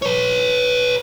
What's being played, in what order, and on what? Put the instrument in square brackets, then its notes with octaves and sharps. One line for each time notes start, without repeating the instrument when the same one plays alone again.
[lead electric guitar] B4 C#5